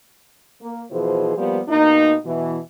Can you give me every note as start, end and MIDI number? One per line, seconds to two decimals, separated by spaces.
0.62 0.82 58
0.91 1.35 47
0.91 1.35 52
0.91 1.35 53
0.91 1.35 68
0.91 1.35 72
1.37 1.59 53
1.37 1.59 55
1.37 1.59 58
1.37 1.59 59
1.37 1.59 67
1.69 2.15 47
1.69 2.15 58
1.69 2.15 63
2.25 2.58 47
2.25 2.58 52